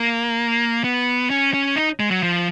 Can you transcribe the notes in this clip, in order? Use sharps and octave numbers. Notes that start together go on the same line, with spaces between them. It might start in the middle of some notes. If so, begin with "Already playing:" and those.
Already playing: A#3
B3
C#4
C#4
D#4
G#3
F#3
F3